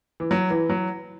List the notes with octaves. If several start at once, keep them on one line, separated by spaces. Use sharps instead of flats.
E3
F#3
E3
F#3